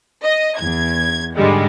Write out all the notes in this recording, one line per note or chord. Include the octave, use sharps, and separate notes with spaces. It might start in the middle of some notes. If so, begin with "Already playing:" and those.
D#5
E2 G#6
G#2 D3 G3 G#3